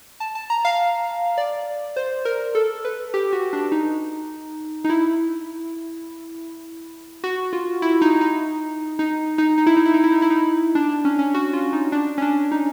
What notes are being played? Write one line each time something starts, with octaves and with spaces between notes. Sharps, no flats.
A5
A5
A#5
F5
D5
C5
A#4
A4
B4
G4
F#4
D4
D#4
D#4
E4
F#4
F4
E4
D#4
D#4
D#4
D#4
D#4
E4
D#4
E4
D#4
E4
D#4
E4
D#4
D4
D4
C#4
C#4
F#4
F4
D#4
D4
C#4
D4
D#4